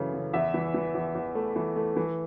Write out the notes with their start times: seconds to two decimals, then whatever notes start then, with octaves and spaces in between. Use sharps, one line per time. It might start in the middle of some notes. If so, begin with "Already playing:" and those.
Already playing: F#2 C#3 E3 A3
0.13 C#3
0.33 E2 E5
0.54 E3
0.74 E3
0.95 E2
1.15 E2
1.35 A3
1.56 E3
1.76 A3
1.96 E3